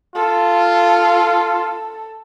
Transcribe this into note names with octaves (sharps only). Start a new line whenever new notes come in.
F4 A4